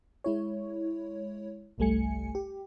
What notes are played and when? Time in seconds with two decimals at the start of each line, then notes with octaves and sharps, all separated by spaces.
0.24 G#3 E4 C#5
1.78 G1 C2 G3 A3 G#5 C#7
2.35 G4